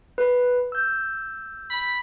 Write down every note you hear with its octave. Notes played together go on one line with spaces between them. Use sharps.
B4
E6 G6
B5